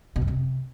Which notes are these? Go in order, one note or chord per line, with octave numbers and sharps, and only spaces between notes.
B2
F#2
C3